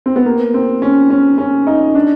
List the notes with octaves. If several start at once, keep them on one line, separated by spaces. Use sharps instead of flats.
C4
B3
A#3
C4
C#4
C#4
C#4
D#4
D4